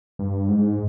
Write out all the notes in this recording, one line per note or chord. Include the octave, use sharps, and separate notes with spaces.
G2
G#2